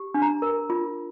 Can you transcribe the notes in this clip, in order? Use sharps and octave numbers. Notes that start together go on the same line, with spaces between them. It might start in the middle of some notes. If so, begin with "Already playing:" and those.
Already playing: G4
D4
A#5
A#4
F4